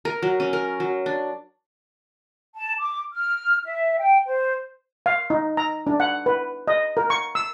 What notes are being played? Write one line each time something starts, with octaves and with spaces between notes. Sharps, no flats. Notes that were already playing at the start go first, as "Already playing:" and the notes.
A#4
F#3
C#4
A#4
F#3
D4
A5
D6
F6
E5
G5
C5
F5
D#4
A#5
D4
F#5
B4
D#5
A#4
C#6
E6